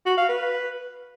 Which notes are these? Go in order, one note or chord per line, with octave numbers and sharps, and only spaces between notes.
F#4
F5
B4